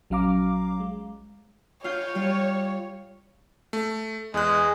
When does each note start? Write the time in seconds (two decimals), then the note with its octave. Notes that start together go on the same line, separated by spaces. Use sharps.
0.10 A#1 F#3 C#4 F5 A#5 D6
0.80 G#3
1.84 F4 C#5 F5 G6
2.15 G3 F4
3.73 A3
4.34 E2 G#3 F#6